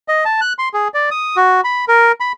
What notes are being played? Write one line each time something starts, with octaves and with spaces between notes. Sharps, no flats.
D#5
A5
F#6
C6
G#4
D5
D#6
F#4
B5
A#4
B5